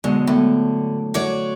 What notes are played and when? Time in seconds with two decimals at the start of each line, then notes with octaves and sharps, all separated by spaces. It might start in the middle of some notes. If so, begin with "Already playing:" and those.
0.04 B2 D3 F#3 G#3
0.27 A2 D3
1.14 F#4 C#5 D5